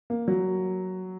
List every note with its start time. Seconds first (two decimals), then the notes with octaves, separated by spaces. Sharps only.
0.10 A#3
0.28 F#3